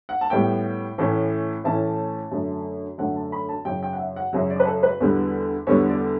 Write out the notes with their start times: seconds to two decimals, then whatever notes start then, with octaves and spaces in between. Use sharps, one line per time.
0.09 F#5
0.21 A5
0.30 A2 G3 B3 G5
0.98 A2 E3 A3 C#4
1.64 A2 E3 A3 C#4 A5
2.32 F#2 D3 A3
2.98 F#2 D3 A3 F#5
3.16 A5
3.32 B5
3.49 A5
3.65 F#2 C#3 F#3 G5
3.83 G5
3.93 F#5
3.99 E5
4.16 F#5
4.33 F#2 C#3 F#3 E5
4.50 D5
4.60 B4
4.66 A4
4.83 B4
5.00 E2 D3 G3 B3
5.67 E2 D3 G3 B3 C#5
5.89 D5